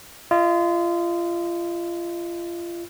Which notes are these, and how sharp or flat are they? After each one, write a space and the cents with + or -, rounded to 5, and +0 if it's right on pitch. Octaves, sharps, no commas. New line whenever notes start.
F4 -30 D#5 +0